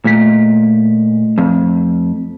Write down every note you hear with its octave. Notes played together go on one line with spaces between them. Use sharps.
A#2 A3 B6
F2